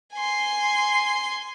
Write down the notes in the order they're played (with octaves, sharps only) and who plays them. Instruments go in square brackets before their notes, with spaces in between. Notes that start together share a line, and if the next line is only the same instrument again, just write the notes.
[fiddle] G#5 C6